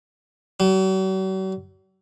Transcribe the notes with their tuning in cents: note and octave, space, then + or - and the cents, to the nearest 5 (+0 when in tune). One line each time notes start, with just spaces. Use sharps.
F#3 +45